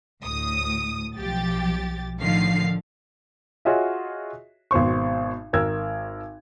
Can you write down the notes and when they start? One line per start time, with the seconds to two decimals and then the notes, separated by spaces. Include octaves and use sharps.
0.23 D2 A2 D#6
1.16 B1 F3 G4 A6
2.20 A2 D3 D#3 F3 F5 C7
3.65 F4 F#4 G#4 C#5 D#5 E5
4.71 G#1 B2 C5 C#6
5.53 G#1 A#4 E6 G#6